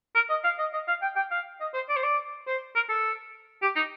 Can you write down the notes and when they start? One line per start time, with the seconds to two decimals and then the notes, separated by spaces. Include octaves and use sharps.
0.15 A#4
0.30 D#5
0.44 F5
0.59 D#5
0.73 D#5
0.88 F5
1.02 G5
1.16 G5
1.31 F5
1.60 D#5
1.74 C5
1.89 D5
1.96 C5
2.04 D5
2.47 C5
2.75 A#4
2.89 A4
3.62 G4
3.76 D#4